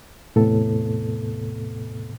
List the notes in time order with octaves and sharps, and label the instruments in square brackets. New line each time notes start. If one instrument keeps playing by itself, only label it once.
[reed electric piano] E2 A2 C3 B3 A4